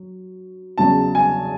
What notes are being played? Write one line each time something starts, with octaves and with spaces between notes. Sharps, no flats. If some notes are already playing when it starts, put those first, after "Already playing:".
Already playing: F#3
E2 C#3 F#3 A5
G#5